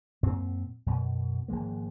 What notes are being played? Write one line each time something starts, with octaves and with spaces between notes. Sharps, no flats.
F#2 A#2 C4
F#2 B2
G#1 F3 G#3 A#3